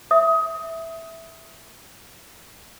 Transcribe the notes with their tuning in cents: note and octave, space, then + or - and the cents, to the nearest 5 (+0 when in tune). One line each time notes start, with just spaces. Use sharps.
E5 +0 D#6 +20